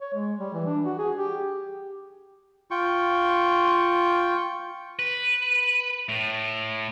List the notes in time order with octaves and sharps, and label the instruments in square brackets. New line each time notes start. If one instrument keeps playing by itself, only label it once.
[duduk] C#5
G#3
G3
E3
D4
F#4
G#4
G4
[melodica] F4 [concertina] G5 C#6
[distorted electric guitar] B4
A2